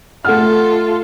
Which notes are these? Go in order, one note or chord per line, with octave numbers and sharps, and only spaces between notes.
A3 F4 A4 F#5 F6